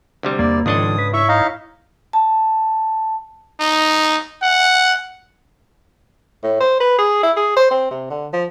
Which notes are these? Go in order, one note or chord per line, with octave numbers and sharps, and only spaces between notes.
D2 C3 G3
E2 A#3 D5
C#2 G#2 D#3 F3 D4 A4 D#5 D#6
B4
E4 C#5 E5 C#6
D#4 D#5 F5
A5
D#4
F#5
A2
C5
B4
G#4
E4
G#4
C5
C4
C3
D3
F3